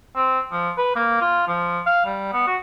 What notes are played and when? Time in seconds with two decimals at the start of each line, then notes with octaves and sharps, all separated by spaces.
0.16 C4
0.52 F3
0.78 B4
0.96 A#3
1.22 F4
1.48 F3
1.86 F5
2.06 G3
2.33 B3
2.47 F#4